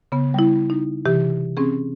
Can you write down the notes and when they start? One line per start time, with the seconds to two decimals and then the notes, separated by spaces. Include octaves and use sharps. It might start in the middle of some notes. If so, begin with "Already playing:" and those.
0.12 C#3 B3
0.34 G3 E4
0.70 D#4
1.06 C3 E3 G4
1.57 C4 C#4 G#4